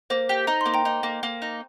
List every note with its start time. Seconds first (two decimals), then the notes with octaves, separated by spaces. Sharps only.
0.10 A#3 C5
0.29 G4
0.47 D#4 A#5
0.61 A#3 C6
0.74 G5 A#5
0.85 D#4
1.03 A#3
1.23 A#3
1.42 D#4